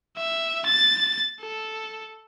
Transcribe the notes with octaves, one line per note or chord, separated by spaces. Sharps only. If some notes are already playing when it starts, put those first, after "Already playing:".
E5
A6
A4